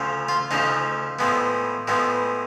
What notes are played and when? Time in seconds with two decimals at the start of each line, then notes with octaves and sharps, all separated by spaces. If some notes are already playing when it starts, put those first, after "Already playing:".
Already playing: D2 C#3 F3
0.29 F4
0.51 D2 C#3 F3 D#4
1.19 A2 F3 G#3 B3
1.87 A2 F3 G#3 B3